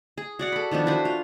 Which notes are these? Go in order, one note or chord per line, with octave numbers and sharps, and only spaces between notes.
G#4
F#4 D5 F#5
A4 B5
D#3 F3 B3 D4
E3 F#4 B4 C5
F4